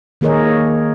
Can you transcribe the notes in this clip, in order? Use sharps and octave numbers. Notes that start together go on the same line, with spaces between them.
D#3 A#3 G#4 A#4 C#5 D#5